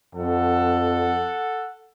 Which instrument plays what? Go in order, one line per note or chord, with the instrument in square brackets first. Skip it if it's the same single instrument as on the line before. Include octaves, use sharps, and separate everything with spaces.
[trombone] F2 [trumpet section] A4 F#5